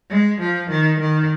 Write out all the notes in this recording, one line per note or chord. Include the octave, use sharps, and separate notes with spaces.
G#3
F3
D#3
D#3